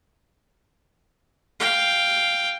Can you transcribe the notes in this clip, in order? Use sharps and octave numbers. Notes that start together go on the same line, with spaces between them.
F5 G5